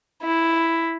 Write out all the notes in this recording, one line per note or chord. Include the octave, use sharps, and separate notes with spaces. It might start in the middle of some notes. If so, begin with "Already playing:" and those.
E4